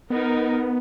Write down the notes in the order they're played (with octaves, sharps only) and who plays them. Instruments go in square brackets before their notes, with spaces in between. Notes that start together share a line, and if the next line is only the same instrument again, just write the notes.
[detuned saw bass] B3 [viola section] D#4 A#4